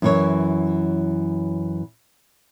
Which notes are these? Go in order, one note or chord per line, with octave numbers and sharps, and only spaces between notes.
F#2 E3 C#5